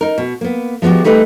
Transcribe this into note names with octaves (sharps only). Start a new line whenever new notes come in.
D#4 A#4
B2
A#3 B3
F3 G#3 B3 F#4 G4
G3 A3 D#4 G4 B4